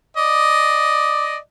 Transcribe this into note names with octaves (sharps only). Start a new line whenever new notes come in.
D5 D#5